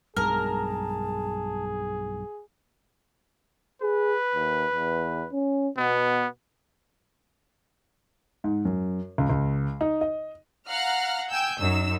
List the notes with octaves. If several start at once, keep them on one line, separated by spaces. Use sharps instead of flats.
B1 G2 G#3 G#4 A#4 A5
G#4 B4
D#2
E2
C#4
B2 B3
G#2
F#2
C#2
C#2
D#4
D#5
F5 F#5 A#5 F6 F#6
G5 G#5 E6 G6
F#2 D#4 E6